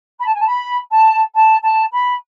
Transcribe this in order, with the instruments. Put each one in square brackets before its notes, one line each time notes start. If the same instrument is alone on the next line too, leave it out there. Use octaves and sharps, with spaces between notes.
[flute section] B5
A5
G#5
A5
B5
A5
A5
A5
B5